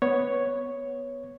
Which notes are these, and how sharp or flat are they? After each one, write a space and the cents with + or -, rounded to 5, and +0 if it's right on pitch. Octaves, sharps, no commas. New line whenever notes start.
B3 +0 C#5 +0